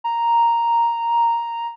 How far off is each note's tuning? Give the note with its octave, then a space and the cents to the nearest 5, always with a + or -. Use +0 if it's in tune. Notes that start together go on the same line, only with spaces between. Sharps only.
A#5 +0